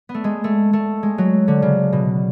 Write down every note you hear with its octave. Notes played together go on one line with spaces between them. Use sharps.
B3
A3
G#3
A3
A3
G#3
F#3
D3
C#3
B2